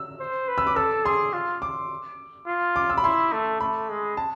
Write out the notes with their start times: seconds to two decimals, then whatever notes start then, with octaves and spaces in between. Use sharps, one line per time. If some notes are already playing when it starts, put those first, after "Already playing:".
Already playing: E6
0.20 C5
0.48 B4
0.58 E6
0.67 D6
0.76 A4 E6
1.05 G#4 C6
1.33 F4
1.62 D6
2.47 F4
2.76 D6
2.90 E6
2.98 B5
3.04 E4 C6
3.33 A3
3.60 A3 B5
3.89 G#3
4.17 A5